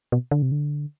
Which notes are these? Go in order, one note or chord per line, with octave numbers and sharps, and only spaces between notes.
B2
D3
C3
D3